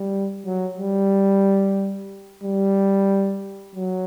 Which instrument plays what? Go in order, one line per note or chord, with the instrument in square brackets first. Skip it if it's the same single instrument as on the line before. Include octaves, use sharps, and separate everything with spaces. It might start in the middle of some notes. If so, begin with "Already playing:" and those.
Already playing: [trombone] G3
F#3
G3
G3
F#3